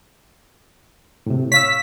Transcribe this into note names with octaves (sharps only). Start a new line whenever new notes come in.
A2 C3
C#5 F5 E6 B6